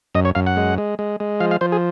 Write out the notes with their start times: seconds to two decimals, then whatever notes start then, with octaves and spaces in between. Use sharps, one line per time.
0.15 F#2 D#5
0.25 C#5
0.35 F#2 F5
0.47 F#5
0.57 G#3
0.78 G#3
0.99 G#3
1.20 G#3
1.40 F3 F5
1.51 F5
1.61 F3 C5
1.72 G#4